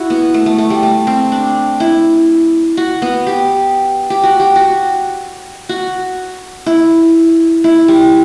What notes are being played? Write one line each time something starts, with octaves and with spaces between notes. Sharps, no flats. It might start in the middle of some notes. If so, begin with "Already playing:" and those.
Already playing: E4 F#4
B3
A3
A3
A3
G3
A3
C4
D4
E4
F#4
B3
G4
G4
F#4
G4
F#4
F#4
E4
E4
G3